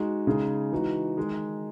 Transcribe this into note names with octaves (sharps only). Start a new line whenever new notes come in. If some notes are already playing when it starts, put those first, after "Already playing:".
Already playing: G#3 D#4 F#4
C#3 G#3 D#4 G#4
E3 G#3 D#4 F#4
D#3 G#3 D#4